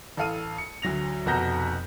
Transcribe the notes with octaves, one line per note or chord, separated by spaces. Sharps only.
A1 A4 F5 D#7
C#7
D2 F#3 A#6 F7
F1 B2 F#4 A#5 G6 A#6